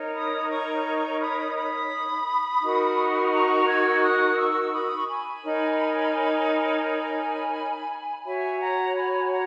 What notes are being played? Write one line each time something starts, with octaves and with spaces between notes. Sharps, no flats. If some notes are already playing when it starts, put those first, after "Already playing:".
Already playing: D#4 A#4 C#5
B5 D#6
A#5 C#6
B5 D#6
B5 D#6
D#4 F#4 A#4
A#5 C#6
E6 G#6
G#6
D#6 F#6
C#6 E6
B5 D#6
D#6
C#6
G#5 B5
D#4 A#4 C#5
G#5 B5
F#4 C#5 E5 G#5
F#5 A#5
G#5 B5
F#5 A#5